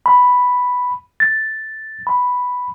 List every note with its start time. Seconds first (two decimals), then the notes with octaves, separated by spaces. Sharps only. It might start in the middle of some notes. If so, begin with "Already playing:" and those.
0.06 B5
1.20 A6
2.07 B5